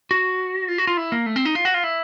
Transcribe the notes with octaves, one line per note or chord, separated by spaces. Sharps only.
F#4
F4
F#4
F4
E4
A#3
A3
C4
D#4
F4
F#4
F4
E4